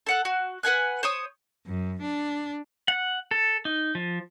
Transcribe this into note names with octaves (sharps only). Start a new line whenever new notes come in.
A4 F#5 F#6
F#4
B4 F#5 G#5 F#6
C5 C#5 D#6
F#2
D4
F#5
A4
D#4
F3